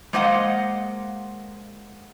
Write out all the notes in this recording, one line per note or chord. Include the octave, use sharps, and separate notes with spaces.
G#3 A#3 C5 D#5 F5 F#5